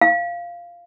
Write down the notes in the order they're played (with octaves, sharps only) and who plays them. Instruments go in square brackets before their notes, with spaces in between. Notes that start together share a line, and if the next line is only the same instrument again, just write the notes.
[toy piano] F5